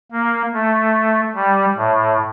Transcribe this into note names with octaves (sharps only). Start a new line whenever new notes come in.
A#3
A3
G3
A2